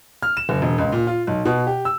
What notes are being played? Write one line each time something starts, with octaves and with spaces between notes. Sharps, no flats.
F6
E7
F#1
E1
C#2
A#2
F4
B1
B2
G4
E6